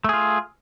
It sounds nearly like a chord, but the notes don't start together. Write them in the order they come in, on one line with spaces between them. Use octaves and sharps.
A3 G#4 F4